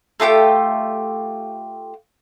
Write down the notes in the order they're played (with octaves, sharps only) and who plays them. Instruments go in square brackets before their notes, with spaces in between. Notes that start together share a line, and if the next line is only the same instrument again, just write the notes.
[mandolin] A3 F4 G4 G5